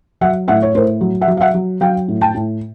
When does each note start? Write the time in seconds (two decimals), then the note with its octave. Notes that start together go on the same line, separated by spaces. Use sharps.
0.21 F#3 E5 F#5
0.48 A2 E5 F#5
0.62 C#5
0.75 A2 A#4 C5
1.01 F#3
1.21 E5 F#5
1.28 F#3
1.37 F5
1.41 E5 F#5
1.54 F#3
1.81 F#3 F5 G5
2.08 A2
2.21 G5 A5
2.35 A2